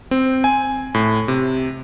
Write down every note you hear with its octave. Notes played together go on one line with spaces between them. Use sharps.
C4
G#5
A2
C3